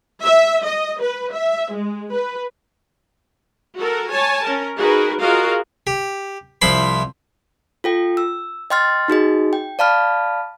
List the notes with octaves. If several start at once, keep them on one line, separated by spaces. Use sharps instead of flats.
E5
D#5
B4
E5
G#3
B4
F#4 A4 A#4
C#5 G#5 A5
C#4 A#4
D#4 F#4 G#4 A#4 B4
F4 F#4 G#4 A#4 D#5 F5
G4
C2 F3 E4 C5 B5 C6
F4 A4 G5
E6
D#5 G5 C6 F6 A6
D#4 F#4 G#4 D#5
G5
D5 F5 A5 B5 F6